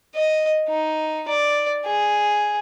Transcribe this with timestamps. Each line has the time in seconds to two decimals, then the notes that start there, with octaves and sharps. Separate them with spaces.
0.15 D#5
0.69 D#4
1.28 D5
1.86 G#4